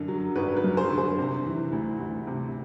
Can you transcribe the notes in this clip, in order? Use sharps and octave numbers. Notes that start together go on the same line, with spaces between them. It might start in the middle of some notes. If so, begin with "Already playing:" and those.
Already playing: F#2 D3
F#3
G#1 B4
B4
F#2
C5
D3
C5
C3
E3
D2
D2
C3